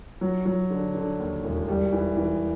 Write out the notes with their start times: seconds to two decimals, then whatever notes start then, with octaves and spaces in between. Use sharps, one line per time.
0.21 F#3
0.45 F#3
0.70 D3
0.95 D3
1.19 D#2
1.44 E1
1.68 G3
1.93 E3
2.17 E3